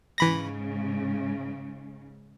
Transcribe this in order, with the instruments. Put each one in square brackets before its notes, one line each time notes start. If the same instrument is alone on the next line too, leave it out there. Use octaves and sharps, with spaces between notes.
[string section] G#2 C#3 [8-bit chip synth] E3 B5 A#6